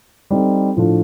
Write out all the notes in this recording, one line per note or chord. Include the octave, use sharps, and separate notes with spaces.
G3 C4 D#4 A4
A2 F3 A3 D4 F4